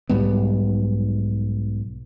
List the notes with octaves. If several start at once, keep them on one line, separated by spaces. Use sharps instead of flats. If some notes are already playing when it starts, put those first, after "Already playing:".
B1 G#2 G3 B3